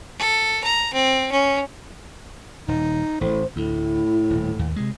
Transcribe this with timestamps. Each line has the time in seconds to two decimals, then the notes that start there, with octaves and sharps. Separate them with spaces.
0.18 A4
0.64 A#5
0.93 C4
1.32 C#4
2.68 D#1 D#4
3.21 A1 A2 C5
3.56 D2 A2 E4
4.30 D#1
4.59 D#2
4.76 C3 G#3